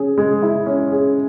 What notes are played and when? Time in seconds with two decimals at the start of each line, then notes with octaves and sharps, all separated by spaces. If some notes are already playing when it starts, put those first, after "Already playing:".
Already playing: C#4 G#4
0.18 G#3
0.43 E4
0.66 C#4
0.92 G#4